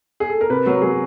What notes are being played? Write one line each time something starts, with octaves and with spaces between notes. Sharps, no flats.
G#4
A4
A#4
C3 B4
F#3 A#4
F#3 G#4